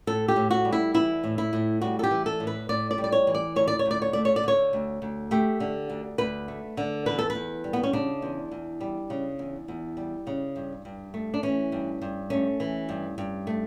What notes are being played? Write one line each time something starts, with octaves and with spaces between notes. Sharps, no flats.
A2 A4
G4
A2
F#4
G3
E4
E3 E4
A2
E4
A2
G3 F#4
A4
G4
E3
A4
A2
B4
A2 D5
D5
G3
D5
C#5
E3
D5
D2 C#5
D5
C#5
D2
D5
C#5
A3 D5
C#5
D5
D3 C#5
D2
D2
A3 G4
D3
D2
D2 B4
A3
D3
E2 B4
A4
B4
E2
G3
B3
C#4
C#3 D4
E2
E2
G3
C#3
E2
E2
G3
C#3
G2
G2
A3
D4
E3 C#4
G2
G2
A3 C#4
E3
G2
G2
A3